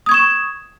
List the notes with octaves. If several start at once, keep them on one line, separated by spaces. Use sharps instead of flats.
C#6 D#6 G#6 E7